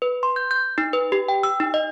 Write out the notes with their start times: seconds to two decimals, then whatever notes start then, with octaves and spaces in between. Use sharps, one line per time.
0.02 B4
0.23 C6
0.36 G6
0.51 G6
0.78 D#4
0.93 B4
1.12 G4
1.28 G5
1.43 E6
1.60 D#4
1.74 D#5